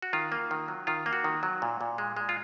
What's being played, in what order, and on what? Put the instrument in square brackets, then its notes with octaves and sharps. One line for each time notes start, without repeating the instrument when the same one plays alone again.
[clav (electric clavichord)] F#4
D#3 F4
A#3
D#3
F#3
D#3 F4
A#3
F#4
D#3
F#3
A#2
A#2
G#3
G#3
F4